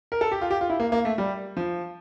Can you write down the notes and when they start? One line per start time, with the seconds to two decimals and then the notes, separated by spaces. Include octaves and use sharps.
0.12 A#4
0.21 A4
0.32 G4
0.41 F4
0.51 G4
0.61 F4
0.70 E4
0.80 A#3
0.92 A#3
1.05 A3
1.18 G3
1.57 F3